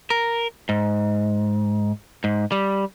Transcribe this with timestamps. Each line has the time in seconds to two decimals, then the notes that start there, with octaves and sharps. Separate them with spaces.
0.10 A#4
0.69 G#2
2.24 G#2
2.52 G3